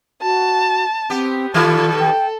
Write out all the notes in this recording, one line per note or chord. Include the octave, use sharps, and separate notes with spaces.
F#4 A5
B3 C4 G4
B2 D#3 G3 F4 A4
G5